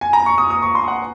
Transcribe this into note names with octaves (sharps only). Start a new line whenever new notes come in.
G#5
A#5
C#6
D#6
D#6
C#6
C6
F#5